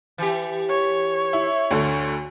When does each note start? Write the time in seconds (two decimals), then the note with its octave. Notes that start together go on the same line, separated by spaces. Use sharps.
0.18 E3 G4
0.69 C#5
1.33 E4
1.71 D2 D3 A3